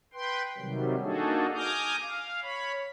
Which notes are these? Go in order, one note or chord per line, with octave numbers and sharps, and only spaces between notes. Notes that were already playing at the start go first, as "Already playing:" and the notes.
B4 G5 C6
C3 D#3 F#3 G3
A#3 D4 D#4 F#4 G#4 A4
G#5 A#5 D6 D#6 F6 G6
F5
C#5 B5